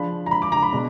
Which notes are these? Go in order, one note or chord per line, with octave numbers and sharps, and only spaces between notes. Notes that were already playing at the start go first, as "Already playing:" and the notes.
Already playing: F3 G#3 D4 B5
A#5
B5
D6
A#5
B5
B2 G#3 D4